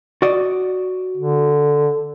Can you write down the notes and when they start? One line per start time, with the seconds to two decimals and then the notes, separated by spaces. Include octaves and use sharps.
0.22 F#4 D5 D#5
1.17 D3